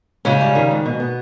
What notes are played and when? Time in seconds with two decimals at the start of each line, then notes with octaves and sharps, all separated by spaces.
0.25 G#2 C#3 C#4
0.41 G3
0.55 D#3
0.71 G#2
0.86 B2
1.00 B3